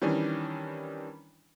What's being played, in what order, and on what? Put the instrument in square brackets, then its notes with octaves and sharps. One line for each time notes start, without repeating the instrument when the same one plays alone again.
[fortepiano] D#3 E3 G3 C#4 D4